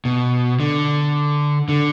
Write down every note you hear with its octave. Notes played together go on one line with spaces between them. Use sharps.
B2
D3
D3